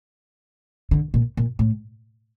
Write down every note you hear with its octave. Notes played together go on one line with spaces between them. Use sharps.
D3
A#2
A#2
A2